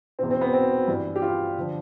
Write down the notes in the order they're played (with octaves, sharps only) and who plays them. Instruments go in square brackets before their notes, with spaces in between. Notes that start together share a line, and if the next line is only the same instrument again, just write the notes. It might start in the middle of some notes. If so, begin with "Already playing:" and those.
[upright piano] E2 B2 C4
C4
B3
C4
G2 E3
G4
F4
D3 F3